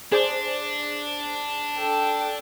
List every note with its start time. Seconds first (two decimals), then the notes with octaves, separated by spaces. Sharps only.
0.12 D4 G#4 C5 D5
1.74 A4 G5